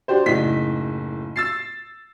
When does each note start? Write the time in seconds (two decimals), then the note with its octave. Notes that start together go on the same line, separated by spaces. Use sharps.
0.08 D4 F#4 G4 C5
0.26 F#1 A2 D#4 B6
1.36 E6 A6 C7